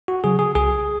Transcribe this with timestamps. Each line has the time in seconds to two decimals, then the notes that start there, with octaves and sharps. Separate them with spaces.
0.08 F#4
0.24 C#3 F#3 G#4
0.39 G#4
0.55 C2 G#4